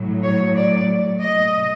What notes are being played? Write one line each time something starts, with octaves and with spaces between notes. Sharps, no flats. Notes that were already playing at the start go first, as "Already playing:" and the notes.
Already playing: A2 F#3
C#5
D5
D#5